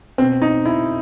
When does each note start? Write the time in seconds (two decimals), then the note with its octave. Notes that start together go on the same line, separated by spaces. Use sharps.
0.18 B2 C4
0.42 D#4
0.65 E4